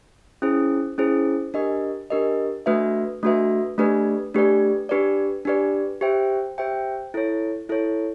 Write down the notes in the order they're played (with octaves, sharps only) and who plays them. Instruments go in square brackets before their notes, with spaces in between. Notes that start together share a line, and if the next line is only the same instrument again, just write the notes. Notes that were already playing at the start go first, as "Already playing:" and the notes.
[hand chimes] C#4 E4 G#4 C5
C#4 E4 G#4 C5
D4 G4 A#4 D#5
D4 G4 A#4 D#5
A3 D4 F#4 B4 E5
A3 D4 F#4 B4 E5
A3 D4 G4 B4 D5
A3 D4 G4 B4 D5
D4 G4 B4 D5
D4 G4 B4 D5
G4 C5 E5 G5
G4 C5 E5 G5
E4 A4 C#5
E4 A4 C#5